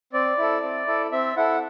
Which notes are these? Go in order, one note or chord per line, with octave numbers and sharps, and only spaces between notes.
C4 D5
E4 A4
C4
E4 A4
C4 E5
E4 A4 F#5